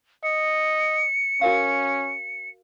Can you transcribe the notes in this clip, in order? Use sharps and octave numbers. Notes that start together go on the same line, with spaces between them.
D#5 C#7
C#4 F#4 A#4 F5